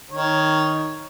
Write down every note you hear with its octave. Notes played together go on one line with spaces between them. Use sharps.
D#3 C#5